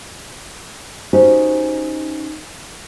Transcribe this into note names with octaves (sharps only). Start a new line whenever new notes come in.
C#4 D#4 F#4 G4 C5 D#5